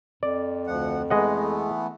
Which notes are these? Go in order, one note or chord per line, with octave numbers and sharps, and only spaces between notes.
F2 D5
D2 F3 F#5
E3 G#3 A3 B3 D#5 F#5